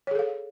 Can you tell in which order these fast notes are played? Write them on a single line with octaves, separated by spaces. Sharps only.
C#5 G#4 A4 F5